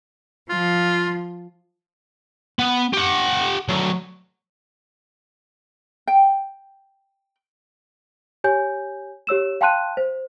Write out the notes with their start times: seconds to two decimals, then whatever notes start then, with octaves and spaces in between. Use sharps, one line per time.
0.50 F3 F4
2.59 B3
2.94 G4 F#5
3.69 F#3 A3
6.07 G5
8.44 G4 C#5 G#5 G6
9.27 G4 C#5 E6 E7
9.61 F5 G5 A5 C6 F#6 D#7
9.97 C5